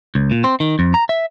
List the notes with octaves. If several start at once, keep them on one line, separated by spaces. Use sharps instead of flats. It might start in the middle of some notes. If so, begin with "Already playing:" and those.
C#2
A#2
C4
D#3
F2
A#5
E5